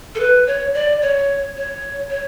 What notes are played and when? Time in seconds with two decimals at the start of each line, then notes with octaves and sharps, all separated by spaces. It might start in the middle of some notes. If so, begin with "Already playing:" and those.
0.15 A4
0.20 B4
0.47 C#5
0.74 D5
1.02 C#5
1.57 C#5
2.10 C#5